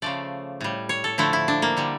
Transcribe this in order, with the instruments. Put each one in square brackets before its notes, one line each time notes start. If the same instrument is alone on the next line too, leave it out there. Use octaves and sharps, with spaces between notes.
[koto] C#3 F3 A3 D5
A2 G3
C#5
A4
D3 F3 A3 E4
E4
D4
A#3
D3 G3